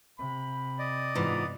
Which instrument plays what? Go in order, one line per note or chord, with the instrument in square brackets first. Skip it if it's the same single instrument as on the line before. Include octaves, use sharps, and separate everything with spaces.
[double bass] C3 [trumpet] B5
[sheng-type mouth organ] D5 D#5
[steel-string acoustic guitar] G#2 E3 F4 [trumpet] B3